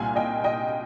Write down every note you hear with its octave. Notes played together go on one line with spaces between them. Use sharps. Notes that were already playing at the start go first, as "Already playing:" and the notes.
Already playing: C2 A#2 G3 F5 G#5
D#5 G5
D#5 G5